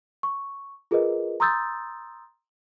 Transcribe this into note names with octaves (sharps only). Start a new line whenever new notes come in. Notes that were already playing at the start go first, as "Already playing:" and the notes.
C#6
F4 G#4 A#4 B4 D#5
A#5 C6 D#6 E6 G6 A6